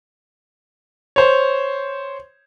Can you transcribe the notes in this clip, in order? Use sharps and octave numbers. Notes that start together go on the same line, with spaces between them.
C5 C#5